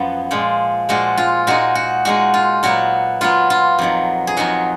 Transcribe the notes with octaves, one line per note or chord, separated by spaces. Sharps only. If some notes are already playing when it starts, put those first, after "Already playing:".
Already playing: F#2 F3 B3
A#2 F3 G#3
A#2 F3 G#3 F#4
F4
A#2 G#3 D#4 F#4
F#4
A#2 G#3 D#4 F#4
F4
A#2 F#3 B3 F#4
A#2 F#3 B3 F4
F4
F2 D#3 F#3
G#4
F2 D#3 F#3 F#4